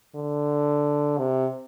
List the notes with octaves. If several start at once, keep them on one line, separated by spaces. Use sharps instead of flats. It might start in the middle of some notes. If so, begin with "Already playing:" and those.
D3
C3